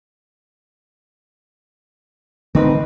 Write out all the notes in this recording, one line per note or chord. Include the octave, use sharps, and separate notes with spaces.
D3 A3 C4 C#4 D#4 B4